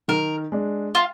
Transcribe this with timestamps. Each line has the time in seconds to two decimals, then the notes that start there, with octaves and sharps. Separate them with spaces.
0.08 D#3 A#4
0.52 G#3 D4
0.95 F4